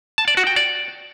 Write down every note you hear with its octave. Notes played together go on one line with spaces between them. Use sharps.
A5
D5
F#4
G5
D5